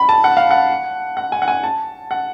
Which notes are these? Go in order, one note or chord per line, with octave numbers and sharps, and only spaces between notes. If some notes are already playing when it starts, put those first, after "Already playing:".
Already playing: B5
A5
F#5
F5
F#5
F#5
G#5
F#5
G#5
A5
F#5